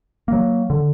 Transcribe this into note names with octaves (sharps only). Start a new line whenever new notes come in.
F#3 A#3
D3